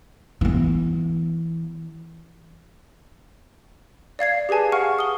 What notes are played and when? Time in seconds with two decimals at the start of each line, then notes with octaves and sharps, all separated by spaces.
0.41 E3 B3
4.19 D5 F5 G#6 C7
4.49 G4 G#4 B4 G#5 A5
4.72 F5 F#5 C#6 F6
4.99 D#6 G7